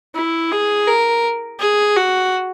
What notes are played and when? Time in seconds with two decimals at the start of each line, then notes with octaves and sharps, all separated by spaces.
0.15 E4
0.52 G#4
0.88 A#4
1.59 G#4
1.96 F#4